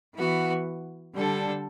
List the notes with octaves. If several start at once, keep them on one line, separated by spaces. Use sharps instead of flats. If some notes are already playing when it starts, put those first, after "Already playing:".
E3 B3 F#4
D3 G3 D4 A4